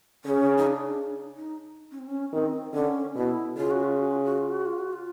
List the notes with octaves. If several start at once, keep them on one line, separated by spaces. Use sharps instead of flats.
C#3 C#4
D#4
D4
D#4
C#4
C4
C#4
D#3 C4
D3 C#4
B2 E4
C#3 F4
F#4
F4
F#4
F4
F#4
F4
F#4
F4
F#4
F4